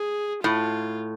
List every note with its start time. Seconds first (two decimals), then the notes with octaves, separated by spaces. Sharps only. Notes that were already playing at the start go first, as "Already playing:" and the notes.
Already playing: G#4
0.44 A2 F4